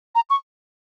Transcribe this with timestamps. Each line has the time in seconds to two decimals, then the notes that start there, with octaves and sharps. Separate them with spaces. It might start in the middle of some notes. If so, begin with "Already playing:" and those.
0.15 A#5
0.30 C#6